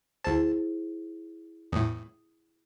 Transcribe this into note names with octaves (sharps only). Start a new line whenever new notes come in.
D2 E4 G#4 C5 A5
E2 A2 D#6